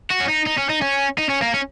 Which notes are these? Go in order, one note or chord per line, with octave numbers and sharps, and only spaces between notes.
F#4
C#4
D#4
D#4
C#4
D#4
C#4
D#4
C#4
A#3
C#4